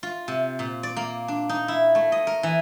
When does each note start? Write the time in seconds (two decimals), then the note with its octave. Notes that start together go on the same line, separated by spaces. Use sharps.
0.03 F4
0.28 C3
0.59 A#2
0.83 D5
0.97 A#3
1.28 D4
1.49 D#4
1.68 E4
1.95 A3
2.12 D#5
2.27 A#4
2.43 E3